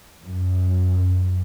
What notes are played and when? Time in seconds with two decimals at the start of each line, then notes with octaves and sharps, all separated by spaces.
0.23 F#2